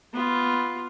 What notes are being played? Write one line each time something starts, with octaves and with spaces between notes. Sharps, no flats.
B3 F4